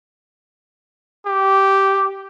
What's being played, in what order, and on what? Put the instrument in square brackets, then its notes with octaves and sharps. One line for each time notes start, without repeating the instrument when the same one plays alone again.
[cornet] G4